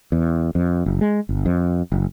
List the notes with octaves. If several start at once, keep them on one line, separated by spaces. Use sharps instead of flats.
E2
F2
F#1
G#3
G1
F2
F#1